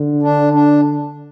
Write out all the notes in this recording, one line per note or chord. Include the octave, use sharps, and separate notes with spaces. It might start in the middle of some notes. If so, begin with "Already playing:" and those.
Already playing: D3
D4
D4